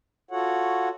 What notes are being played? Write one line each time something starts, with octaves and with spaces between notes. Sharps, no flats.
F4 F#4 A4 C#5 F#5